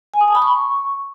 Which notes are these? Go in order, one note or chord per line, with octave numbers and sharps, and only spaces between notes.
G#5
D#6
A5
B5
C#6